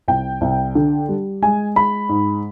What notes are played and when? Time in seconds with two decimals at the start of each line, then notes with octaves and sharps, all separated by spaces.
0.08 C2 G5
0.41 C2
0.75 D3
1.09 G3
1.42 G#3 G#5
1.76 G#3 B5
2.09 G#2